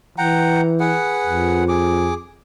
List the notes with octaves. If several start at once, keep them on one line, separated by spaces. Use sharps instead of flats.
E3 F#5 G5 A#5
G#4 B4 F#5
F2
G#4 D6